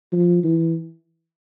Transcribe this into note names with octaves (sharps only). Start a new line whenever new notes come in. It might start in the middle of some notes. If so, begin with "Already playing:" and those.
F3
E3